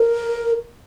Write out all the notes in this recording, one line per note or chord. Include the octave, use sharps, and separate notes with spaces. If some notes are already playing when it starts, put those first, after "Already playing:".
Already playing: A#4